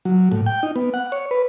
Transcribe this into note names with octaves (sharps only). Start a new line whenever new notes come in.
F#3
A2
G5
D#4
B3
F#5
C#5
B4